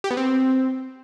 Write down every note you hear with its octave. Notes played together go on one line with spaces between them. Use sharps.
G4
B3
C4